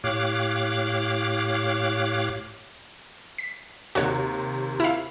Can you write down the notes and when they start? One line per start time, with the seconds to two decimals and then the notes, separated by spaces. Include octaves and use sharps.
0.04 A2 G4 C#5 F5 D6 F#6
3.38 B6
3.95 D#2 C3 F#4 C#5
4.80 E4 F5